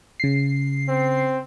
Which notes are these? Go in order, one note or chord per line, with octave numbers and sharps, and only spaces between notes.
C#3 C7
C4